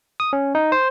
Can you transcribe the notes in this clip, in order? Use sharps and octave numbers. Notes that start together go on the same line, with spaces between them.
D#6
C#4
D#4
C5